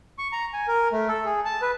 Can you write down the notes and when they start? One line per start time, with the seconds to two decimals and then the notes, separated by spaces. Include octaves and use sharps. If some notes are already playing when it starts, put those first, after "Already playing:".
0.18 C#6
0.32 A#5
0.53 G#5
0.68 A#4
0.92 A3
1.09 A4
1.25 G#4
1.45 A5
1.62 B4